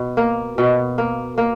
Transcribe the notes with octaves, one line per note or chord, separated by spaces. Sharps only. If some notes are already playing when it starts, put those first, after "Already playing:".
Already playing: B2
A#3
B2
A#3
A#3